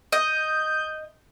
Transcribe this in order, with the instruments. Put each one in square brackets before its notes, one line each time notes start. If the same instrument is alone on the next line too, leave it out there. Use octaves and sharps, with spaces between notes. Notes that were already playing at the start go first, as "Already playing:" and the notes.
[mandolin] D#5 [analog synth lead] G6